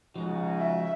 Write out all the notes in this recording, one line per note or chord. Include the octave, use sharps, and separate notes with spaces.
C#3 F3 G#3 D#4 F#4
E5